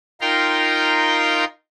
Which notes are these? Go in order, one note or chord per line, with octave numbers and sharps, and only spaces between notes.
D#4 F4 A#4 G5 A#5 C6